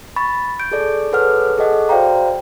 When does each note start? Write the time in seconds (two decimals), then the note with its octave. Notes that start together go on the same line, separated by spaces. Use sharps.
0.16 B5 C#6 A6
0.60 G6 D7
0.71 G#4 A4 D5
1.12 G#4 A4 B4 C#5 F#5 F6
1.58 G#4 A4 D#5 F#5
1.89 F#4 C5 D5 F5 G5 A#5